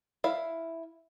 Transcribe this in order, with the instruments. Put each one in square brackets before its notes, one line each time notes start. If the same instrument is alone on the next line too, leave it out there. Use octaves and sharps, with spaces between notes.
[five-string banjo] E4 F5